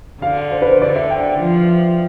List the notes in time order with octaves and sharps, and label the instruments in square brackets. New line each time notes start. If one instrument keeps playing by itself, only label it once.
[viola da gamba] D3 [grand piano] F5
[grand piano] C5
B4
C5
[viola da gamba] D3 [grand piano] D5
[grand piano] E5
G5
[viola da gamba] F3